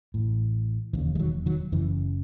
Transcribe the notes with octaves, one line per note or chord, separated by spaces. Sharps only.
A1 A2
E1 D#2 C#3 E3
G#3
D#3 F#3
D#3 F#3
F#1 F#2 C#3 E3